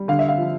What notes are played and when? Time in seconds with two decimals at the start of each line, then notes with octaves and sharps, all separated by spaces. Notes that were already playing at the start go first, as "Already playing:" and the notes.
Already playing: G3
0.08 D3 F5
0.19 E5
0.29 F5
0.38 F3